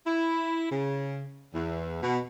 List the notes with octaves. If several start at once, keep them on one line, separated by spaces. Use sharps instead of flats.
E4
C#3
E2
B2